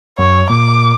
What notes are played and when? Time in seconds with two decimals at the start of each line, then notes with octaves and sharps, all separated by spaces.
0.19 F#2 C#5
0.50 A#2 D6